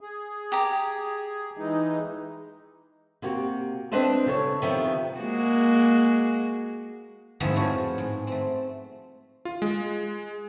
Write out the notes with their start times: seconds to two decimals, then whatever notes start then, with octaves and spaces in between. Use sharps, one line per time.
0.01 G#4
0.52 G4 A#5
1.58 E3 G#3 D#4
3.22 C3 A#3 F#4 G4
3.92 C4 D4 B4 C5 D#5 A5
4.26 C#3 A4 C#5
4.62 C3 D#3 F3 B3
5.18 G#3 A#3 F#4
7.40 F2 G#2 A3 B3 E4 A5
7.55 A2 F3 F#4 C#5
7.98 G#2
8.27 A3 C4
9.45 F4
9.62 G#3